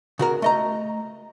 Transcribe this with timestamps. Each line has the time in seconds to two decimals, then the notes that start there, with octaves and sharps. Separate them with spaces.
0.19 C#3 F#4 A#4
0.42 A3 D#5 A#5